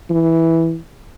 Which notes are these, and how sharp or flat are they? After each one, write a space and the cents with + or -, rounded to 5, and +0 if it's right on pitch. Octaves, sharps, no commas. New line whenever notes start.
E3 -5